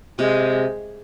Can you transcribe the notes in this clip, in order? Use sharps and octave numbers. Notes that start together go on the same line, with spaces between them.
C3 G#3